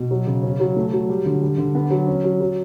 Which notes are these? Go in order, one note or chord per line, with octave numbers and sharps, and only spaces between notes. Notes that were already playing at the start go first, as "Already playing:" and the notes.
Already playing: B2
F#3
C#3
C#4
F#3
A3
F#3
G3
D3
G3
D3
B3
F#3
C#4
F#3
F#3